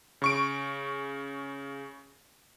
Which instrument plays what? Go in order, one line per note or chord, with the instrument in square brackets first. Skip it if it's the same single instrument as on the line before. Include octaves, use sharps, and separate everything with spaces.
[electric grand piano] C#3 C#6 D7